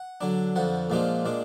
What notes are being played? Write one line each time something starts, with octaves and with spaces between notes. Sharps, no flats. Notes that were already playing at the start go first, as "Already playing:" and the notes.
Already playing: F#5
D3 F#3 D4
F2 D3 F3 F#5
A#2 F3 G#3 D4 F4
A#2 G#3 D4